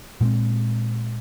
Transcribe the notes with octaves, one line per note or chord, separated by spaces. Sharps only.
A#2 G#3 C4